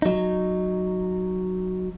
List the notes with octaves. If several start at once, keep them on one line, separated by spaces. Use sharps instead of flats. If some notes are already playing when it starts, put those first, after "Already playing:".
F#3 D#4